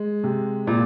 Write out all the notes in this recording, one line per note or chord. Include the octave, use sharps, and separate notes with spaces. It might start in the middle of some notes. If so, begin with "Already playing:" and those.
Already playing: G#3
C3
A#2